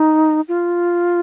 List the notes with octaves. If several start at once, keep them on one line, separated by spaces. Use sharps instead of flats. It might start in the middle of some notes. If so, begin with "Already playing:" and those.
Already playing: D#4
F4